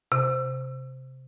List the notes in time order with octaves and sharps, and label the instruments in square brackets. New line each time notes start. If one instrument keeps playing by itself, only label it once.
[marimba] C3